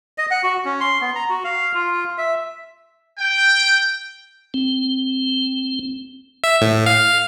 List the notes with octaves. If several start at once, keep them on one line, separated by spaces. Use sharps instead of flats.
D#5
F#5
F#4
C#4
C6
B3
A#5
F#4
F5
F4
E5
G5
C4
E5
A2
F5